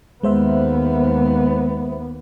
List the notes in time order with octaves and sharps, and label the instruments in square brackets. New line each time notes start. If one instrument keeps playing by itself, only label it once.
[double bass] D#2 B3 [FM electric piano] G#3 C5 E5